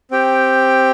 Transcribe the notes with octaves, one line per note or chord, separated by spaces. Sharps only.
C4 G4 G5